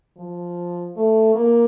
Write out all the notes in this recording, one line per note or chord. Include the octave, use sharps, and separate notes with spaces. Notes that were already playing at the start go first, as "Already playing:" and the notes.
F3
A3
A#3